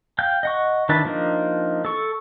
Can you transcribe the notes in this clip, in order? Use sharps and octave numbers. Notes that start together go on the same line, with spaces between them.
F5 G5 G6
D#5 F#5 C#6
D#3 D4 E4 B4 A5
F3 A#3 D4 D#4
A4 C#6